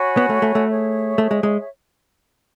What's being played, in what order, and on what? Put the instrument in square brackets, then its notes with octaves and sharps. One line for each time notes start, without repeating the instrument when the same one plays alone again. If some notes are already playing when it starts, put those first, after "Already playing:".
Already playing: [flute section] F#4 C#5 G#5 B5
[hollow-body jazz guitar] B3
A3
A3
A3
[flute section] G#4 C#5 E5
[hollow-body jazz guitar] A3
G#3
G#3